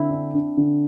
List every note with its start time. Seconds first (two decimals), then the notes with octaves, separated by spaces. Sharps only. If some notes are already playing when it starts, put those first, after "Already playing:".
Already playing: D3 C4 E4
0.10 D4
0.34 D4
0.57 D3